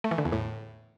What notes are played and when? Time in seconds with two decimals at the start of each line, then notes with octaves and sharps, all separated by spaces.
0.04 A3
0.11 E3
0.18 D3
0.25 E2
0.32 A2